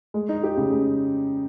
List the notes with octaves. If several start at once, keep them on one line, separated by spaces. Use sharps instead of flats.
G#3
D#4
G4
C#3
G#3